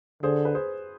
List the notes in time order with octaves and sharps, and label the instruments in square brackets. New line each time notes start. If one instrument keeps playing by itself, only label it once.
[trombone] D3 [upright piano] G#4 C5
[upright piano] B4
G#4 C5